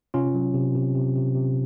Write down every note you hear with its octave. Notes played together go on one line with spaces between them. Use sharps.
C3 C#4 F4
F#3
C3
C3
C3
C3
C3